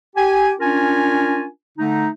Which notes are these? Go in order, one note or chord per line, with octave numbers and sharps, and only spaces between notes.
G4 G#5
C#4 D4 F4 A#4 G#5
D3 A3 D#4